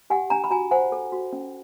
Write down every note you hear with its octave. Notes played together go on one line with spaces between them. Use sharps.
G4 F#5 G#5
D4 G#5 A#5
B5
F#4 G#5 A#5
C5 F#5 G#5
A4
F#4
C#4